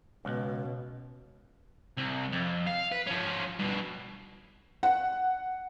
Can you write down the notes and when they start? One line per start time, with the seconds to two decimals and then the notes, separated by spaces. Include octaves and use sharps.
0.25 C#2 B2
1.97 C2
2.32 F2
2.67 F5
2.92 B4
3.07 F3 C#4
3.60 G2 B2
4.83 F#5